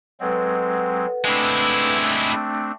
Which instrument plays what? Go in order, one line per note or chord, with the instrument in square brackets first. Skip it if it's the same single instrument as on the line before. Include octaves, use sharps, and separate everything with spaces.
[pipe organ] F#3 G#3 C4 [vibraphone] A4 B4 F#5
[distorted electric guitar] G#3 E4 [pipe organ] A3 C4 D4